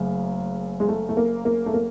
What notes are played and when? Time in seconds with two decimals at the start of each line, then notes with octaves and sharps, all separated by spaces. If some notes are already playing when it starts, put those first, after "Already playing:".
Already playing: F#1 F#2 C#3 A3
0.80 G#3
0.89 A3
1.09 A3
1.17 A#3
1.45 A#3
1.66 A3
1.74 A#3